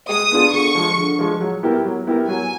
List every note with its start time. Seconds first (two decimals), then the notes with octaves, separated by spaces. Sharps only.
0.09 G#3 D#6
0.31 B3 D4 F4 G#4
0.53 D3 C#6
0.75 F3 G#3
0.97 D3
1.19 F3 G#3
1.41 F#3
1.63 B3 E4 G4 A#4
1.85 F#3
2.07 B3 E4 G4 A#4
2.28 F#3 G#5